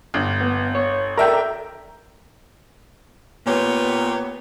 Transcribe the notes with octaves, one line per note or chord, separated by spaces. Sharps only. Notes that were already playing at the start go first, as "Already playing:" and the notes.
G1
B3
C#5
A4 A#4 D5 E5 G5 A#5
A#2 B3 G4 C#5